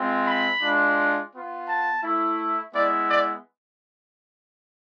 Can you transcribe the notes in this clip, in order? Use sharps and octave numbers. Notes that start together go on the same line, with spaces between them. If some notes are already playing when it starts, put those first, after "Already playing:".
Already playing: G#3 C4 F4
B5
G#3 D4 F4
B3 F4
A5
A3 E4
G#3 B3 E4 D5
D5